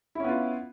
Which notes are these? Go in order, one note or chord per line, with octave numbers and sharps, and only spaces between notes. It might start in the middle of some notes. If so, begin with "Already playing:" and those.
B3 C#4 E4 F4